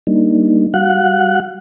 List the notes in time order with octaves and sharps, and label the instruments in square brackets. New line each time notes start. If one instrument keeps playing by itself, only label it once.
[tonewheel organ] G3 A#3 D4 D#4
G3 F#4 F5 F#5 F#6